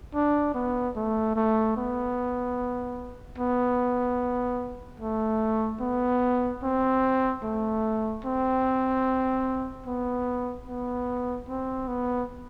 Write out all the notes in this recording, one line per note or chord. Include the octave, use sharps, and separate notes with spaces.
D4
B3
A3
A3
B3
B3
A3
B3
C4
A3
C4
B3
B3
C4
B3